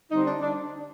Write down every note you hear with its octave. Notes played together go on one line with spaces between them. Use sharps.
D3 G3 C4 D#4
D4
D4